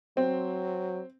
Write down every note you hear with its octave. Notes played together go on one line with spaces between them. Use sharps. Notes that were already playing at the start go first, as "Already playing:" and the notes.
F#3 C4